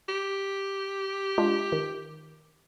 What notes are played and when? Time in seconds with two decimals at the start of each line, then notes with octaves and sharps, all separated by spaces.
0.09 G4
1.38 G#3 D4 F4
1.72 D#3